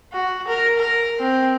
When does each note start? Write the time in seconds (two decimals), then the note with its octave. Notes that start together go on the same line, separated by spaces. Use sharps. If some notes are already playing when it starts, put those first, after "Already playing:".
0.13 F#4
0.48 A#4
0.78 A#4
1.20 C4